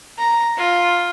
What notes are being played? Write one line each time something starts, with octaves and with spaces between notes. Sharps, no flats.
A#5
F4